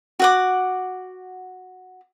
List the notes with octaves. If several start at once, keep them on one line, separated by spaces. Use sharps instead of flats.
F#4 F#5 D6